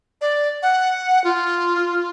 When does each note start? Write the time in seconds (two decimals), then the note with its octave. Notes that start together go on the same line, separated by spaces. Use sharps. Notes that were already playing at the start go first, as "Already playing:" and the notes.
0.21 D5
0.63 F#5
1.24 F4